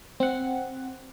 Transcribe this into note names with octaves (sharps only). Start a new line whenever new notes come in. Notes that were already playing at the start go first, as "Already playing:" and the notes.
C4 F#5